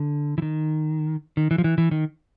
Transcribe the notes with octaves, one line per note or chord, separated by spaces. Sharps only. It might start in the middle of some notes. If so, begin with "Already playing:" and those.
Already playing: D3
E3
D#3
D#3
E3
F3
E3
E3
D#3